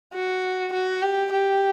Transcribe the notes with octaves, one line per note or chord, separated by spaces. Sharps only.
F#4
F#4
G4
G4